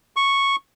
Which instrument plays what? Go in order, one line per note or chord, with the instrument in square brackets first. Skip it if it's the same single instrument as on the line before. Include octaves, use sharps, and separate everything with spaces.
[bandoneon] C#6